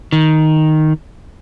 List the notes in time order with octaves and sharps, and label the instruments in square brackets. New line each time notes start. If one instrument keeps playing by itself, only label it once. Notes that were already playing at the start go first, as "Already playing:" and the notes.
[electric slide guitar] D#3